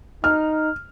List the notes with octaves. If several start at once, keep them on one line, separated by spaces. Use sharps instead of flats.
D#4 F6